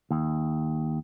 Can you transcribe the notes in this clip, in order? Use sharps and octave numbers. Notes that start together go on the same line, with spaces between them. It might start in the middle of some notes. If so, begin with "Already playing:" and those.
D#2